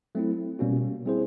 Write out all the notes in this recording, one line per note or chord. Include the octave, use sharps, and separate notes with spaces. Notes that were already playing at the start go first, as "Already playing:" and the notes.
F#3 A3 C4 E4
B2 G3 A#3 C#4 F#4
G3 C4 E4 G#4 C5